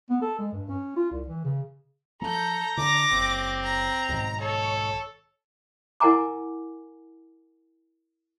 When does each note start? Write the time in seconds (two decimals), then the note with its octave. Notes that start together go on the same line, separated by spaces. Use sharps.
0.10 B3
0.22 A4
0.39 G#3
0.53 G2
0.69 C#4
0.96 F4
1.11 C2
1.28 E3
1.45 C#3
2.22 F3 A4 A#5 G6
2.77 D3 D6 A#6
3.11 F#1 C4
3.64 A#5
4.09 B1 G#2 D#3
4.41 A4 C#5
6.00 E4 A#4 F#5 G#5 A#5 D6